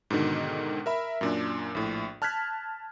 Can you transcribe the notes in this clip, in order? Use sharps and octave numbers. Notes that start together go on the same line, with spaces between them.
G#2 B2 D3 D#3
A#4 E5 B5
F#2 A#2 D4
A#1 A2
A5 F6 F#6 G#6 B6